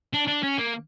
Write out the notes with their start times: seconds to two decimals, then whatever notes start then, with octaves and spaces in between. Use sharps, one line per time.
0.13 D4
0.27 D4
0.43 C#4
0.58 A#3